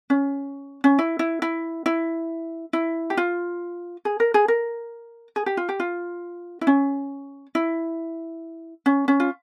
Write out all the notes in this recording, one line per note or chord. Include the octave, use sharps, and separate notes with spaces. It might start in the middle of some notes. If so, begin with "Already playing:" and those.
C#4
C#4
E4
E4
E4
E4
E4
G4
F4
G#4
A#4
G#4
A#4
G#4
G4
F4
G4
F4
E4
C#4
E4
C#4
C#4
F4